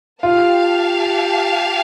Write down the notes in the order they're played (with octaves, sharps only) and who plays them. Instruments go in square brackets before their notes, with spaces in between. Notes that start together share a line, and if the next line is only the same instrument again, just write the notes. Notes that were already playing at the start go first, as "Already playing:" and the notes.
[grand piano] F4 [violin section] G4 F5 A5